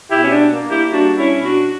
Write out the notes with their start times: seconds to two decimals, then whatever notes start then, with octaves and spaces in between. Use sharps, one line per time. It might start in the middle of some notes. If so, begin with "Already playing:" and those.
0.10 B2 E4 G4
0.24 C#4
0.31 D4
0.50 A#3
0.70 E4 G4
0.91 G3 D4 F#4
1.18 C#4 E4
1.32 B2
1.45 D4 F#4